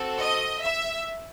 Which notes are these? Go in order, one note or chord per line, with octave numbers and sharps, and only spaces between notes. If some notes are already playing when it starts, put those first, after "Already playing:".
Already playing: C4 F#4 A4
D#5
E5